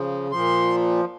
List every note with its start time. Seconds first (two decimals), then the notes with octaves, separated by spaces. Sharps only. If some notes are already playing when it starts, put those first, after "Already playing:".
Already playing: C#3 F3
0.32 A#2 F3 C6